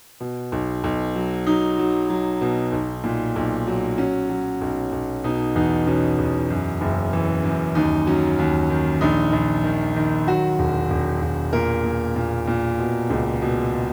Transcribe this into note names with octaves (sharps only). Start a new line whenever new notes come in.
B2
B1
B1
F#3
F#3 D#4
F#3
F#3
B2
B1
A#2
B1
F#3
F#3 C#4
F#3
B1
B1
B2 D#4
E2 D#4
B2 C#4
E2
F#2
F#1
E3
F#2
D#2 D#4
F#3 C#4
D#2
D#3
A#1 D#4
A#1
D#3
D#3
F#3 F#4
E1
E1
E1
A#2 A#4
A#2
A#2
A#2
B2
C#2
B2